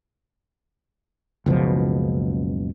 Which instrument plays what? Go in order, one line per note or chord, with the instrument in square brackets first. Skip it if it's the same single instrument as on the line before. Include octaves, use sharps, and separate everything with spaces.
[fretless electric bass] F#1 C#2 B2 F3